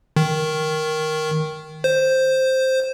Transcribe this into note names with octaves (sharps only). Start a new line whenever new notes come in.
D#3
C5